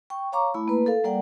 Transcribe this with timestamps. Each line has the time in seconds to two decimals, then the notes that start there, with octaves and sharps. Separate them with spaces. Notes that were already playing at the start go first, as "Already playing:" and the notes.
0.10 G5 C#6
0.32 C#5 F5 A#5 C#6 D6
0.54 A3 E4 B5
0.68 A#3 B4
0.86 A4 A#4 F5
1.04 G3 A#3 A#4 D5 F#5 G5